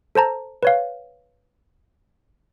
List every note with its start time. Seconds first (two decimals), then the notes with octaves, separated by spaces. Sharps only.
0.15 A4 C5 A5 A#5
0.63 B4 C#5 F5